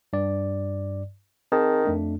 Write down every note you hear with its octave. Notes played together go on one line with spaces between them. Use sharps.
G2 D5
D#3 C4 G#4 A5
F2 A3 D4